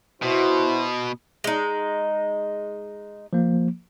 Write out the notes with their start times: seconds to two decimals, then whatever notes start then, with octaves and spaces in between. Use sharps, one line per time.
0.22 B2 E4 F#4 C5
1.44 G#3 D#4
3.33 F3 A#3